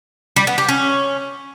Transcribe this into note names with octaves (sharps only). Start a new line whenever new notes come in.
G3
B3
G4
C#4